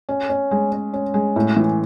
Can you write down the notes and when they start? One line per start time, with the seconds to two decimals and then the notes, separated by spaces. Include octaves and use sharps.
0.09 C#4
0.29 C#4
0.51 G#3
0.72 C#4
0.93 C#4
1.14 G#3
1.36 A2
1.56 E3